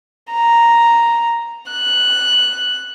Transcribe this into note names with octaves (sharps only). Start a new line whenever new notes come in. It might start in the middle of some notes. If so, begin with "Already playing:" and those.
A#5
F#6